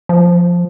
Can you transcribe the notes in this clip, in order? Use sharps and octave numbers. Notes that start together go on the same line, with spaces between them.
F3